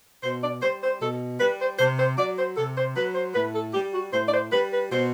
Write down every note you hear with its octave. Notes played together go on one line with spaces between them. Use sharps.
B2 C5
D5
G3 C5
C5
B2 A4
G3 B4
C5
C3 C5
C5
F#3 D5
C5
C3 A4
C5
F#3 B4
C5
A2 B4
A4
G3 G4
F#4
A2 C5
D5
C5
G3 B4
B4
B2 C5